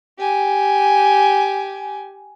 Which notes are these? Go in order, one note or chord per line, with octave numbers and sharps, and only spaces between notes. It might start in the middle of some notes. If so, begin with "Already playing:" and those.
G4 G#5